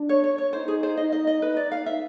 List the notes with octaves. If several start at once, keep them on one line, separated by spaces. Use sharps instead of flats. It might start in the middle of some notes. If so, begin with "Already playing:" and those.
Already playing: D4
C#5
C#5
C#5
D#4 C5
G#4
C5
D#4 D#5
D#5
D#5
D#4 B4
D5
F5
E5